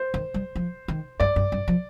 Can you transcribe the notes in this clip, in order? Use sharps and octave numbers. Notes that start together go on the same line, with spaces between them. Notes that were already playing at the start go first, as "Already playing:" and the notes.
Already playing: C5
D#3
G3
F3
D#3
G2 D5
G2
G2
F3